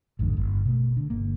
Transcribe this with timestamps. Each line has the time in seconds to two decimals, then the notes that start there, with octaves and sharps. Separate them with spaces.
0.19 A1 F2 G#2 D3
0.37 G1
0.65 B2 A3
0.97 D3
1.10 G1 A#3